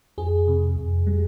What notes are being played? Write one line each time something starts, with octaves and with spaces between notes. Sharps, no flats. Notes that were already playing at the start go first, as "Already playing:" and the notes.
F2 G#4
C3
F2
G3